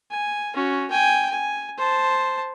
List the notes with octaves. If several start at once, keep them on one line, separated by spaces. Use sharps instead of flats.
G#5
C#4 F#4
G5 G#5
G#5
C5 A5